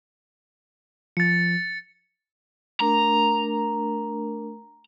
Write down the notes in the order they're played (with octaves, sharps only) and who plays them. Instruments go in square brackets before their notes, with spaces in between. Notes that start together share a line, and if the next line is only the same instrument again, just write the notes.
[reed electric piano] F3 [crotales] A6 C#7
[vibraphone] A3 D4 A#4 [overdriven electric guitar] A#5